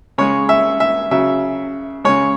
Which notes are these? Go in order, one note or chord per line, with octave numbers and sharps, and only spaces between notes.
C#3 G#3 C#5
E5
E5
C#3 F#3 E5
C#3 G#3 C#5